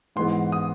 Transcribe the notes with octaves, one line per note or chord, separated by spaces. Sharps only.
G#2 E3 G#3 B3 C6
D#6